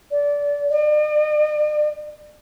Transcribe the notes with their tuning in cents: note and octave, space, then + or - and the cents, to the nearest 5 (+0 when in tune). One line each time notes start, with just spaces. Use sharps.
D5 -20
D5 +45